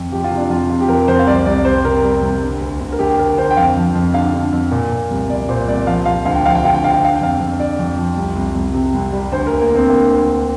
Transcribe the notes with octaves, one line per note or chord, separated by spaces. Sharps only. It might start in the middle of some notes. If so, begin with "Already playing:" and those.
Already playing: F2
F3 G4
F4
C3
D4
F2 F4
C3 F4
G4
F2 A#4
F2 C5
F5
C2 D5
C2 D5
G3 C5
C3 A#4
G3
C2
D3
D2
D2
A#4
D2 G4
D2 A#4
D3 C5
G5
F2 F5
F3
F2
D3 F5
D3
F2
A#2
A#2
C2
C2 D5
A#2 C5
C2 D5
F3 F5
F3 F5
D2 F5
G5
F3 F5
G5
D2 F5
G5
D3 F5
G5
D3 F5
G5
F2 F5
F2
D3 D5
F2
F3
C2
C2
C2
C3
C2
G3
D2 C5
A#4
D2
A#3
D2
C4
D2 A#3
D2
D3